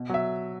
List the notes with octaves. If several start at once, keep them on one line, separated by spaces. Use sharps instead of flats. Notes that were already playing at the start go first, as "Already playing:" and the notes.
Already playing: B2
F#3 E5